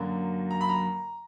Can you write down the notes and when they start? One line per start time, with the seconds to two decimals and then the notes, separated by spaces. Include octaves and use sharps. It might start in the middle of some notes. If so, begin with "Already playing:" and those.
Already playing: F#2 D3 F#3 A#3
0.51 A#5
0.61 B5
0.69 A#5